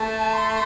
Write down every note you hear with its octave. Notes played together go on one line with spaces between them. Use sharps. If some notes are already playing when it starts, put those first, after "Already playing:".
Already playing: A3 A5
C6